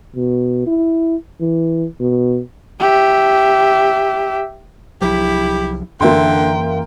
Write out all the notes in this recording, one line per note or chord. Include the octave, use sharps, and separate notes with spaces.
B2
E4
E3
B2
G4 E5
C2 F3 F#3 E4 G4
F#2 D3 E3 A#3 E5 G5 C6